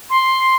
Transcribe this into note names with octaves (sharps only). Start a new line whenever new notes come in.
C6